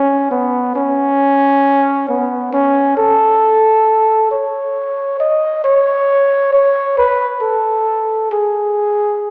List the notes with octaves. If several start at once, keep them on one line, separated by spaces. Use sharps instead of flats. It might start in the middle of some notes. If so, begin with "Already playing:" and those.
Already playing: C#4
B3
C#4
B3
C#4
A4
C#5
D#5
C#5
C#5
B4
A4
G#4